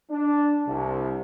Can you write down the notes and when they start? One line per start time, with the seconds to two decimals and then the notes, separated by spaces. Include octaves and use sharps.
0.10 D4
0.67 C2